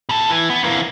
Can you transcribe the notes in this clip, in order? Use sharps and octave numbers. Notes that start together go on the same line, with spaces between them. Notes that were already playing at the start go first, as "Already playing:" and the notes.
B2 A4
E3
B3
E3 A#3